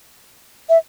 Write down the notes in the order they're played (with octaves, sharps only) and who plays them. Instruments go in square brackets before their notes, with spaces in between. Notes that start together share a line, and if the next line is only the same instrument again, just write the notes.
[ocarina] E5